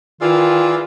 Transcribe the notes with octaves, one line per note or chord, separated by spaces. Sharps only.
D#3 E3 F4 G#4 D5 E6